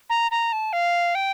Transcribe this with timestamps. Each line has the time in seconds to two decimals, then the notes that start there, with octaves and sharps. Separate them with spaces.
0.10 A#5
0.31 A#5
0.52 A5
0.73 F5
1.15 G5